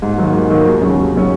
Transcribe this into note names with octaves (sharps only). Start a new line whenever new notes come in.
G#2
D#3 F#3 A#3
G#2
D#3 F#3 A#3
D#2
C#3 F#3 C#4
D#2
C#3 F#3 C#4